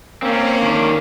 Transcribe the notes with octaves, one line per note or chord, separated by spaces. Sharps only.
A#3 C4 C#4
D#3 C#4 D4